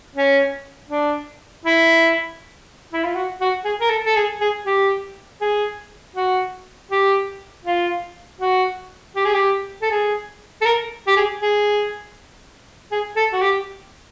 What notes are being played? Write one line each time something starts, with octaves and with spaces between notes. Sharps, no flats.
C#4
D4
E4
E4
F4
F#4
F#4
G#4
A#4
A4
A4
G#4
G#4
G4
G#4
F#4
G4
F4
F#4
G4
G#4
G4
A4
G#4
A4
A#4
G4
G#4
G#4
G#4
A4
F#4
G4